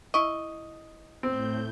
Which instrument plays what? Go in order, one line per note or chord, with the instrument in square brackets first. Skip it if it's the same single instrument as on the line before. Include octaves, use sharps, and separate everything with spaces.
[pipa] E4 C#6 [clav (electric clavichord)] D#5
[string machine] A2 G6 [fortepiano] C4